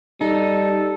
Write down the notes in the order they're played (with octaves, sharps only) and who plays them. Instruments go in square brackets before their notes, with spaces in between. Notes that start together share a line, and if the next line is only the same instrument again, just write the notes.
[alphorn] G3 [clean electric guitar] D#4 [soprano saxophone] A4